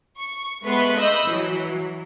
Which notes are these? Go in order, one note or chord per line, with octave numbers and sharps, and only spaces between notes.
C#6
G#3 A3 B3 B4 C6 C#6
D#5 B5 D#6 E6 G6
E3 F#3